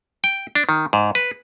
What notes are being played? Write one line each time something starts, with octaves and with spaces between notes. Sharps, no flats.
G5
D4
D#3
G#2
B4